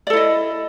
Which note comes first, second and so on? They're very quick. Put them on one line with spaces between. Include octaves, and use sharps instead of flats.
D5 A4 E4 D#5